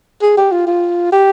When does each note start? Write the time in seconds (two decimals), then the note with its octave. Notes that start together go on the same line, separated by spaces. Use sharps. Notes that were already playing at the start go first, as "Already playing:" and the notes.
0.22 G#4
0.37 G4
0.52 F4
0.67 F4
1.12 G4